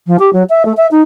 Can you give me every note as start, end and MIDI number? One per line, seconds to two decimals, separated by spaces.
0.07 0.16 53
0.19 0.30 67
0.33 0.43 54
0.49 0.63 76
0.65 0.72 57
0.77 0.87 76
0.91 1.02 63